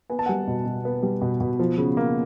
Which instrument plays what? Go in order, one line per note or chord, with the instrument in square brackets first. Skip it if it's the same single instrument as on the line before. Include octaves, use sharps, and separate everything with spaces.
[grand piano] B3 G#5
A5
G3 F#5 G#5
B2
B2
B3
G3
B2
B2
F3
C#3
A#3